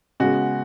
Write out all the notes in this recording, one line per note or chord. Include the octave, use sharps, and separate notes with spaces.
C#3 G#3 B3 F#4